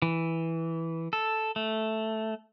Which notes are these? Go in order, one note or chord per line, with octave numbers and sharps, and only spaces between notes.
E3
A4
A3